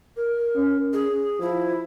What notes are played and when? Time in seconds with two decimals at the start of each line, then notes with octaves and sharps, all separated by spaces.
0.17 A#4
0.56 C#4
0.93 G#4
1.41 F3 E4